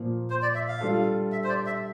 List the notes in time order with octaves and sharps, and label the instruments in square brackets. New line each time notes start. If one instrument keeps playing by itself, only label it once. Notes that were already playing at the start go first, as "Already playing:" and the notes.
Already playing: [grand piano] A#2 F3 A#3
[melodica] C5
D5
E5
F5
[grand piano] G3 D4 F4 A4
[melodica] E5
C5
D5
E5